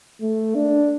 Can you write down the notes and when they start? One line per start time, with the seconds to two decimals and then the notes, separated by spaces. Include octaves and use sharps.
0.21 A3
0.55 D4